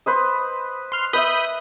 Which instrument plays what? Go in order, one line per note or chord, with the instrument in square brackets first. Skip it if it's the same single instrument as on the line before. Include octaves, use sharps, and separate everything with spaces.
[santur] B4 C5 D#5
[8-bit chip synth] C6 F6
[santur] B4 D#5 E5 [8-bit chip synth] B5 D#6 G6